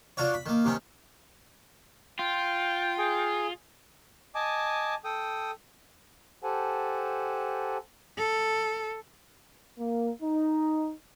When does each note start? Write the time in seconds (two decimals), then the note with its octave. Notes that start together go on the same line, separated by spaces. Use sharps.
0.17 D4 F4 F#4 C#5
0.34 B5
0.46 D#3 A#3
0.65 C3 D#3 C#4
2.19 F4 G5
2.98 G#4
4.35 D#5 G#5 A5 D6
5.04 A4 G5 D#6
6.44 G4 A4 C5 F#5 G#5 A5
8.18 A4
9.79 A#3
10.22 D#4